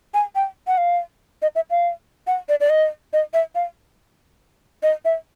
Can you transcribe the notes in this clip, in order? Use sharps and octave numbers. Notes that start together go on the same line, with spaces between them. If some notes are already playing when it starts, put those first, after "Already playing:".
G#5
G5
F#5
F5
D#5
E5
F5
F#5
D5
D5
D#5
D#5
E5
F5
D#5
E5